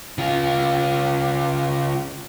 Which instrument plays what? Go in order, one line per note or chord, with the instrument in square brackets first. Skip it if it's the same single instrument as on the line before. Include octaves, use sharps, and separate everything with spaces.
[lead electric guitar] C#3 F4